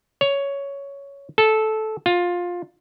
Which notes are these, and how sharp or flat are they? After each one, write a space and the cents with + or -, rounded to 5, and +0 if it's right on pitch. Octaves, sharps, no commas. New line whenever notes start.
C#5 +10
A4 -10
F4 +15